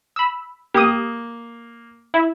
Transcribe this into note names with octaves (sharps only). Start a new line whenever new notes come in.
B5 E6
A#3 G4 D#6
E4